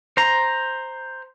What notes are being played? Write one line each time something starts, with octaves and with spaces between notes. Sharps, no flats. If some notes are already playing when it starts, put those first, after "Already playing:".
C5 A#5